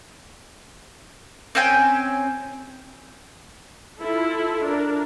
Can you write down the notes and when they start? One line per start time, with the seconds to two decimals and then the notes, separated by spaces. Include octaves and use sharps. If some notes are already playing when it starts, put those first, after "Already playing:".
1.55 C4 C#4 G5 G#5
4.00 E4 F4 A4
4.63 D4 A#4